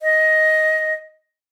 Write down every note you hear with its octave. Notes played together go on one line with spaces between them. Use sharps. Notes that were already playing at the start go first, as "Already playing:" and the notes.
D#5